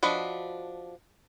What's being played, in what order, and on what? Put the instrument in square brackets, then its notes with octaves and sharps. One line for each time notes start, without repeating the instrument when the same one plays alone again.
[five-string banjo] F3 D4 F#4 B4 D#5